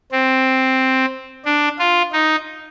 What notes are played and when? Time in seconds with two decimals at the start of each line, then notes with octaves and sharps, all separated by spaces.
0.12 C4
1.45 D4
1.79 F4
2.12 D#4